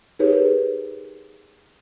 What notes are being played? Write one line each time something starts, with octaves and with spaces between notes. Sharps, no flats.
D#4 G4 G#4 A#4 B4 C#5